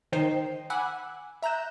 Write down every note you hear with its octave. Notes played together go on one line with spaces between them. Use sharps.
D#3 D#4 C5 G5 C7
F#5 G#5 B5 D6 E6 F#6
E5 A#5 F#6 G6 E7